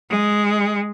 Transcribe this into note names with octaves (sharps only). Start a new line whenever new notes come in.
G#3